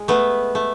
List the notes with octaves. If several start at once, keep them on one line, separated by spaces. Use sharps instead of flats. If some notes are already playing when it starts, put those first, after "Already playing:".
Already playing: G#3
A3 B3
A3